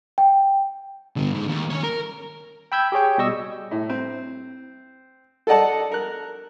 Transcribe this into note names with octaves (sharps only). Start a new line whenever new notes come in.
G5
G2 D3
G#2
D#2
C#4 C#5
A#4
G5 B5 E6 G6 G#6
G4 G#4 C#5 G5
B2 G3 D#5 C#6 E6
A2
C4
A4 D5 D#5 F#5 A5
A#4 F#6